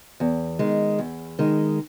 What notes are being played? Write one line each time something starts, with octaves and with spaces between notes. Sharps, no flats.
E2
D#3 G#3
E2
D#3 G#3